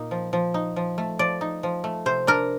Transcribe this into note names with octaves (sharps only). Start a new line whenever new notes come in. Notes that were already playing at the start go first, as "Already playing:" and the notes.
Already playing: A#2 A#3 D#4
F3
F3
D#4
F3
A3
F3 D5
D#4
F3
A3
C3 C5
D4 A#4